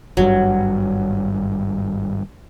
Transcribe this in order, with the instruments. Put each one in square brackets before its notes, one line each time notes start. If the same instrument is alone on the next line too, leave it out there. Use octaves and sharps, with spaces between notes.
[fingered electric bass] G#1 G2 G3 [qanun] F#3